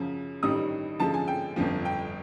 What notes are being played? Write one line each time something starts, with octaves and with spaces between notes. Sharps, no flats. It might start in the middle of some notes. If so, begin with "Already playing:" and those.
Already playing: F#2 C#3 F3
A1 G2 D#3 G3 D#6
F#2 D3 F3 G#3 A5
G#5
G5
G1 F2 D3 F3
G5